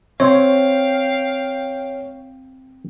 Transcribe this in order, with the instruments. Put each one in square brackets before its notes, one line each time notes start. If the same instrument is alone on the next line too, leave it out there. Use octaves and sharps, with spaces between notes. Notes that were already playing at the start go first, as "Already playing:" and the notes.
[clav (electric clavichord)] C4 [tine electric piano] C#5 [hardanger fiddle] F5 G5